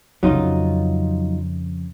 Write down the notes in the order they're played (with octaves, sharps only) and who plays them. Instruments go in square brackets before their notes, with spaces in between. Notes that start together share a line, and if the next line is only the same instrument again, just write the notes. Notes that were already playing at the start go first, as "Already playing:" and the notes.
[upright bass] F2 C#3 [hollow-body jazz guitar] F#3 D#4 F4